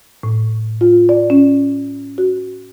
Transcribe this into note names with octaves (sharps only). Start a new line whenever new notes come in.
A2
F4
D5
C#4
F#4